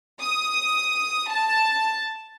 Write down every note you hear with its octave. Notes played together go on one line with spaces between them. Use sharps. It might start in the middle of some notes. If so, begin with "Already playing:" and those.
D#6
A5